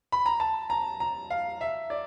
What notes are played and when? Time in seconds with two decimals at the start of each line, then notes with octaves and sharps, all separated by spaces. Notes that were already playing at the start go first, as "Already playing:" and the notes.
0.12 B5
0.26 A#5
0.40 A5
0.70 A#5
1.00 A#5
1.30 F5
1.61 E5
1.90 D5